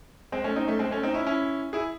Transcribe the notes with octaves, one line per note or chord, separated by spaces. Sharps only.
G#3 C4
A3 C#4
C4 D#4
A3 C#4
G#3 C4
A3 C#4
C4 D#4
C#4 E4
C#4 E4
E4 G#4